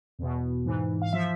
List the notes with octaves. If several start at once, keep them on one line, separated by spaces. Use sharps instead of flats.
E2 B2
G#2 E3
F5
F3 E5